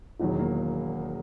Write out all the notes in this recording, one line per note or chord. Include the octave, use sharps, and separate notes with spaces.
E1 E2 D#3 F#3
A#3